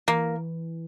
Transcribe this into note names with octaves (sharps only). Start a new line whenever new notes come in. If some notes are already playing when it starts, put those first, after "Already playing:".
E3 A#3